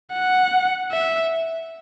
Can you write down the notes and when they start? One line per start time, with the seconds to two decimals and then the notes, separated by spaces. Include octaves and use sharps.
0.13 F#5
0.92 E5